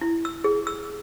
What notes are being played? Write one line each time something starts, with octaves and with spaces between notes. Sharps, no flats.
E4
E6
G#4
E6